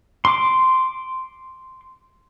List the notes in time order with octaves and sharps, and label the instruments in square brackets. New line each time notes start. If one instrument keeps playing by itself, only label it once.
[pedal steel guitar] C6 D6